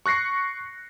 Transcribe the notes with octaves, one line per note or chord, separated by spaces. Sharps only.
C#6 F#6 A#6 C7 C#7